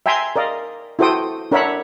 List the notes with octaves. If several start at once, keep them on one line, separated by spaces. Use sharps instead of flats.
E5 G5 G#5 A#5 C6
A#4 D5 D#5 F5
E4 F#4 A4 C5 G5 D#6
D4 A#4 C#5 E5 F#5 B5